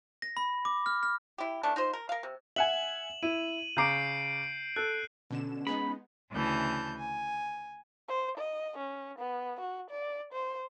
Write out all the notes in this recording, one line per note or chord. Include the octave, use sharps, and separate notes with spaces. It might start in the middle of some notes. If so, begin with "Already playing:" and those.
A#6
B5
D6
F6
F6
E4 G4
D#3 E3 A3 D4
D#4 F4 C5
A#4
A#4 F5
C3
E5 F#5 G#5 E7 F#7
E4 D#7
C#3 A#5 D6 G6 C7 D7
A4 F#6
B2 D3 C#4 E7
G#3 B3 D#4 B5
D2 C#3 E3 A5 G6
G#5
C5
D#5
C#4
B3
F#4
D5
C5